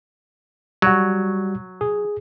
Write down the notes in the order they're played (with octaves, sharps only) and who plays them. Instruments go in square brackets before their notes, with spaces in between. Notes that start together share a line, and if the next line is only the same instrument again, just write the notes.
[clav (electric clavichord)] F#3 [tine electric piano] G3 F#4
[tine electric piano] G#4